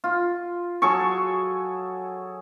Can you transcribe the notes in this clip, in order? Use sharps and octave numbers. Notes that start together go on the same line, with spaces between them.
F4
F#3 G#4 A4 C#6